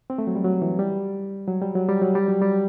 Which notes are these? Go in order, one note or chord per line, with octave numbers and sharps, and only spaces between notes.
C4
A3
F#3
G3
F#3
E3
G3
F#3
G3
F#3
G3
F#3
G3
F#3
G3